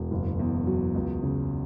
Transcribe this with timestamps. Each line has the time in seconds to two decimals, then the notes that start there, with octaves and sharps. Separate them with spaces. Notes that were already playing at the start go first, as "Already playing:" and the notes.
Already playing: E1
0.11 F#1
0.39 E2
0.67 F#3
0.94 C#2
1.23 C#3